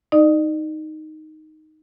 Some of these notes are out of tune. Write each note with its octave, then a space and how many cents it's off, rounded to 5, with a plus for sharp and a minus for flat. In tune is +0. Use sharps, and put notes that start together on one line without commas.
D#4 +0 D5 +45